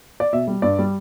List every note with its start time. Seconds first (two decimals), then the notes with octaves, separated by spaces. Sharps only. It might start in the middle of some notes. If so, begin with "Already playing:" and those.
0.20 D5
0.33 B2 E5
0.48 G3
0.62 G2 D5
0.79 G3